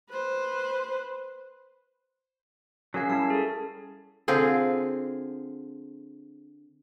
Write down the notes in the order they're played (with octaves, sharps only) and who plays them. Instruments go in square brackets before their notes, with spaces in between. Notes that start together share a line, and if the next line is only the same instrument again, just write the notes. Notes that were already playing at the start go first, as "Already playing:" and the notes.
[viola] B4 C5
[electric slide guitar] F#3 G#4 [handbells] C#4 A#4 F5
[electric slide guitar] G3 C#4 E4 [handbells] A5
[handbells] G#4 A4
[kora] D3 C4 F4 G#4